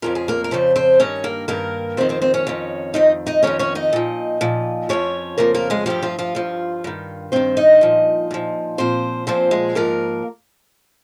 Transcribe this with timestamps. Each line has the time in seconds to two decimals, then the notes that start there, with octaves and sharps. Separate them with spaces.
0.02 F2 C#3 F3 A#4
0.15 G#4
0.28 A#3 A#4
0.44 A#4
0.51 F2 C#3 F3 C4 C5
0.76 C4 C5
1.00 G2 D#3 C#4 C#5
1.24 A#3 A#4
1.48 G2 D#3 A#3 A#4
1.97 F2 D#3 C4 C5
2.09 C4 C5
2.22 C4 C5
2.34 C#4 C#5
2.47 F2 D#3
2.94 F2 D#3 D#4 D#5
3.27 D#4 D#5
3.43 F2 D#3 C#4 C#5
3.59 C#4 C#5
3.75 D#4 D#5
3.93 A#2 F3
4.41 A#2 F3
4.89 F2 C#3 F3 C#4 C#5
5.38 F2 C#3 F3 A#3 A#4
5.54 A#3 A#4
5.70 G#3 G#4
5.86 G2 F3 G3 G4
6.03 F3 F4
6.19 F3 F4
6.35 G2 F3
6.84 G2 D#3
7.32 G2 D#3 C4 C5
7.57 D#4 D#5
7.81 A#2 F3
8.31 A#2 F3
8.78 A#2 F3 C4 C5
9.27 A#2 F3 C4 C5
9.51 G#3 G#4
9.75 G#2 F3 A#3 A#4